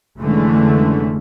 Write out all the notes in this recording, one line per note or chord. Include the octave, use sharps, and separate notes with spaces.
F1 D3 E3 G#3 A3 C#4